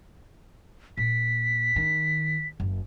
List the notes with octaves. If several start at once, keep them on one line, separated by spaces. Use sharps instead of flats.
A#2 B6
D#3
F#1